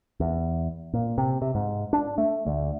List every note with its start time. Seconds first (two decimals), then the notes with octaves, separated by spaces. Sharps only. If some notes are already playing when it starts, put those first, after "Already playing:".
0.20 E2
0.94 A#2
1.18 C3
1.42 C3
1.55 G#2
1.93 D4
2.18 A3
2.47 D2